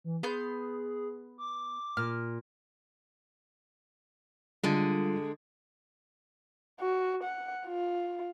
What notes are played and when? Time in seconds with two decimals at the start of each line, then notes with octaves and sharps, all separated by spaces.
0.04 E3
0.23 B3 G#4 C6 G6
1.38 D6
1.97 A#2 F6
4.64 D3 G3 G#3 F4
6.80 F#4
7.24 F#5
7.66 F4